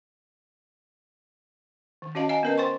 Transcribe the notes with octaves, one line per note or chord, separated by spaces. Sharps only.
D#3
C#4 F#4 C#5 D#5 F5 A5
D#5 F5 G#5 A#5
B3 C#4 A#4 B4 D#5
C5 G5 C6 C#6